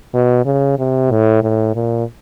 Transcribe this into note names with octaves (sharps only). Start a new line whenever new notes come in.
B2
C#3
C3
A2
A2
A#2